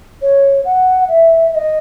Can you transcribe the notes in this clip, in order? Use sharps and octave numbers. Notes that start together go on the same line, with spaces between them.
C#5
F#5
E5
E5
D#5